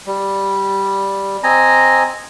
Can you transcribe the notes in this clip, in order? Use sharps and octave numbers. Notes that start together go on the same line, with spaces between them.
G3
C4 D#5 G#5 A#5